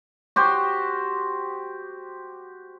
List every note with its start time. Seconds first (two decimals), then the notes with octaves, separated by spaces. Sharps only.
0.36 F#4 G4 C5